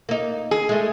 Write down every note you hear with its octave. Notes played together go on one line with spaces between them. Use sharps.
A#3 D#4
G#4
G#3 A3